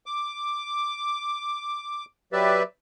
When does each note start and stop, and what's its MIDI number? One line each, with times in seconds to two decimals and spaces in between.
0.06 2.05 86
2.33 2.63 54
2.33 2.63 67
2.33 2.63 71
2.33 2.63 74
2.33 2.63 76